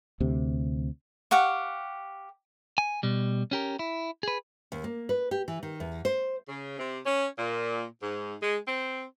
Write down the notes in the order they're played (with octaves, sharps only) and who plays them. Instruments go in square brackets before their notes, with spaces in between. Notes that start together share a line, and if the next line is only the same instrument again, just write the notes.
[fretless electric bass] D2 C3
[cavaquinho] G4 F5 F#5 C#6
[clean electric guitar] G#5
B2 G3
C#4 G4 A#4
E4
G#4 B4
[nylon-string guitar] D#2
A#3
B4
G4
E3
D#3
E2
C5
[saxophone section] C#3
C3
C#4
A#2
G#2
G#3
C4